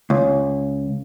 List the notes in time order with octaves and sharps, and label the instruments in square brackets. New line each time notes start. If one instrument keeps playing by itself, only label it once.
[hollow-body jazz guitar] C#2